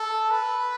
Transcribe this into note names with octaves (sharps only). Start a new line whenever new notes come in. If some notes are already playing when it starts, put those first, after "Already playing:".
Already playing: A4
B4